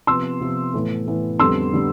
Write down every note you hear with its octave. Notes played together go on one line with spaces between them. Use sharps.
C3 F3 B3 C6 E6
C3 F3 B3
A2 E3 B3
A2 E3 B3
F2 D3 G3 B3 C6 E6
D3 G3 B3